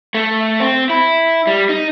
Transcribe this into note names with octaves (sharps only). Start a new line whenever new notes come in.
A3
C4
E4
G3
D#4